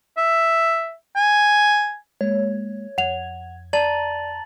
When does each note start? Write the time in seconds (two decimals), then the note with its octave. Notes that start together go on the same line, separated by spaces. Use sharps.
0.18 E5
1.16 G#5
2.21 G#3 A#3 C#5
2.98 F2 F#5 G#6 F7
3.73 D5 A5 A#5 A6 F#7